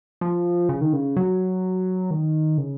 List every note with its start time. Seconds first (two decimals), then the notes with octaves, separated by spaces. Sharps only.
0.21 F3
0.69 C#3
0.81 D#3
0.93 C#3
1.17 F#3
2.11 D#3
2.58 C#3